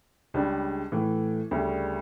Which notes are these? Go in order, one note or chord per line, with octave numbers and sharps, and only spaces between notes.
C#2 C#3 G3 D4
A2 E3 A3
D2 C#3 G3